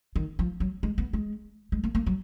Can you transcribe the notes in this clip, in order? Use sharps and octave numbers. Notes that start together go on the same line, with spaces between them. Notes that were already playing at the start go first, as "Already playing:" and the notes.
D#3
F3
F#3
G#3
B3
G#3
G#3
A#3
A#3
F#3